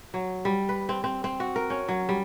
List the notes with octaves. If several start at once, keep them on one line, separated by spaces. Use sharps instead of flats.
F#3
G3
B4
C4
C4
C4
F#4
A#4
C#4
F#3
G3